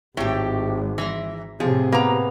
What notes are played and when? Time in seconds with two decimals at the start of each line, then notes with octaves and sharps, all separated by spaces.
0.17 G#1 A2 G4 G5
0.98 E3 E5 A#5 C6
1.60 A2 C3 F3 G#4
1.92 A#3 B3 A#5